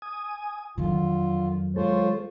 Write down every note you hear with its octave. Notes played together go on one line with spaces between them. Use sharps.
G#5 D#6
F2 D3 D#3 F#3 F4
G#3 F4 A4 C5 C#5